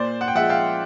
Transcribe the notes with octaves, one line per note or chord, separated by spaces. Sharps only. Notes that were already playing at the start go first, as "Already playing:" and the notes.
Already playing: A#2 C5 D5
F#5
G5
F3 G#3 E5 F#5
F5 G5